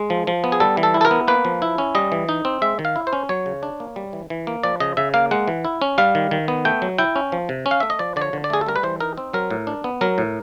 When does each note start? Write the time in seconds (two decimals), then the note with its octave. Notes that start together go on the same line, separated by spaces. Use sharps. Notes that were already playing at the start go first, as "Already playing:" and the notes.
Already playing: G#3
0.10 F3
0.27 F3
0.44 B3
0.52 G#4
0.60 G3 A4
0.77 E3
0.83 A4
0.94 E4
1.01 A4
1.05 A#4
1.11 B3
1.28 A#3 B4
1.45 F3
1.62 E4
1.78 C#4
1.95 G3 D#5
2.12 E3
2.29 D#4
2.45 C4
2.62 G#3 E5
2.79 D#3
2.85 F5
2.96 E4
3.07 C5
3.13 C#4
3.29 F#3 C#5
3.46 C#3
3.63 D4
3.80 A#3
3.96 G3
4.13 E3
4.30 E3
4.47 A#3
4.63 F3 D5
4.80 C#3 D#5
4.97 C#3 E5
5.14 A#3 F5
5.31 G#3 F#5
5.48 E3
5.65 E4
5.82 C#4
5.98 G3 F5
6.15 D#3
6.31 D#3
6.48 B3
6.65 A3 G5
6.82 F#3
6.98 E4 G5
7.16 C#4
7.32 F3
7.49 C3
7.66 C#4
7.71 F5
7.80 A3 E5
7.90 D#5
7.99 F3 D5
8.16 D3 D5
8.21 C#5
8.33 D3
8.44 D5
8.50 A3 G#4
8.61 A4
8.66 G3 A#4
8.76 B4
8.83 E3 C5
9.00 D#4 A#4
9.18 C4
9.33 F#3 A#4
9.51 A2
9.67 D4
9.84 B3
10.01 F#3 A#4
10.18 A2